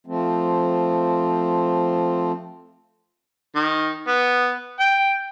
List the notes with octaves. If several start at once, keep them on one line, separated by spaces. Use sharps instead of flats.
F3 A3 C4
D#3
B3
G5